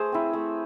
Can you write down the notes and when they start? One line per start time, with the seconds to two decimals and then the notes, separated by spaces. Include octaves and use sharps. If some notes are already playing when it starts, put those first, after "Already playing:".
Already playing: A3 G#4 C5
0.12 C4 E4
0.33 A3